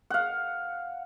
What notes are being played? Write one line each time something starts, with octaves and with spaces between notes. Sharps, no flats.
F5 F#5